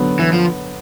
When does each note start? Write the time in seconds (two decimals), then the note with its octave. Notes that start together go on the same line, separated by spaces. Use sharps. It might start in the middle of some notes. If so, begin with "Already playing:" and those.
Already playing: D3 F#3 B3
0.19 E3
0.32 F3